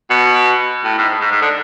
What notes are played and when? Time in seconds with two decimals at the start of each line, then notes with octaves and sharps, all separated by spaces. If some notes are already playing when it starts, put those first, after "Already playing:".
0.10 B2
0.84 A2
0.98 G#2
1.21 G#2
1.32 G#2
1.41 D3